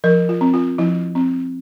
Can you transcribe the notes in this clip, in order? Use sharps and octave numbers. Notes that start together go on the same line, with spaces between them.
F3 A#4
F4
C4
F4
F3 E4
C4